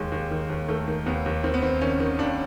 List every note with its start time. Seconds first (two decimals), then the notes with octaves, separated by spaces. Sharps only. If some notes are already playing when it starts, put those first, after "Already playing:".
Already playing: D#2 G#3
0.12 D#2
0.31 D#3
0.50 D#2
0.68 D#3 A3
0.88 D#3
1.06 D#2 B3
1.26 D#2
1.44 D#3 C4
1.54 B3
1.62 D#3 C4
1.81 D#3 C#4
2.00 D#3
2.19 D#2 D4